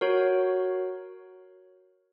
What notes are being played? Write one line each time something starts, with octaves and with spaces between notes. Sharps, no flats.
F#4 A#4 C#5